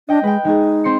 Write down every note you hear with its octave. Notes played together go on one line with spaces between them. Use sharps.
D4 D#5 G5 A#6
G#3 B4 G5
G#3 D#4 G#4
C4 C6 C#7